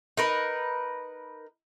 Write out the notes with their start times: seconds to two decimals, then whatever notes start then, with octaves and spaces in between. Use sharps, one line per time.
0.17 D#4 A#4 B4